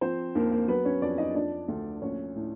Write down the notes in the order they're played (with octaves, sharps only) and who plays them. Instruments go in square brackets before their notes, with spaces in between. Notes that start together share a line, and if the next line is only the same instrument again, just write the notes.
[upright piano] F3 C4 C5
D#2 A#3 A#4
A#3 A#4
F#3 B3 B4
C#4 C#5
F2 D4 D5
D#4 D#5
F3 D4 D5
D2
A#1 C#4 C#5
A2